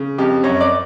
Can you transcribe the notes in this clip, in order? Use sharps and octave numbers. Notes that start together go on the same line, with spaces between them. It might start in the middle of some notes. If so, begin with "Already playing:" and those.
Already playing: C#3
F2 G4
F#2 C#5
D5